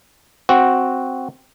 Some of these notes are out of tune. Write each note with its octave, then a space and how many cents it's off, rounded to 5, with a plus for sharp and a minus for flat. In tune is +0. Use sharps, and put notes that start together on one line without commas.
C4 +0 F#4 +0